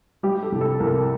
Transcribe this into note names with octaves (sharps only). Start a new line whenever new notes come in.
G3 G4
A4
C2
A4
C2 A#4